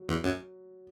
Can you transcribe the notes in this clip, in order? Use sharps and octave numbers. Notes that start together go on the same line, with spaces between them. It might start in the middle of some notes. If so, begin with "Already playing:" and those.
Already playing: F#3
E2
F#2